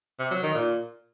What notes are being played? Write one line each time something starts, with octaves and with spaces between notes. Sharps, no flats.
C3
F#3
D#3
A#2